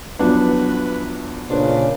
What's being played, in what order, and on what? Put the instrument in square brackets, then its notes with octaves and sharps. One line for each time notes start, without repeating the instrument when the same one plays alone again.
[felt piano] E2 D4 [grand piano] F3 F#3 B3 [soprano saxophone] B4
[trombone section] A#2 C#3 [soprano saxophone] D4 [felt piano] B4 C5